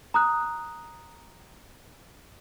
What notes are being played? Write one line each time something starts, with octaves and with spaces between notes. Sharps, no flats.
A#5 D#6 F#6